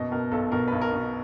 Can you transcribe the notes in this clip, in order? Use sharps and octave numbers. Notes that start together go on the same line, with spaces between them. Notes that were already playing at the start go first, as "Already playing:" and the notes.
Already playing: F#1 B2 D#5
B2 A#4
B1 A4
B2 A#4
B1 B4
A#4
B2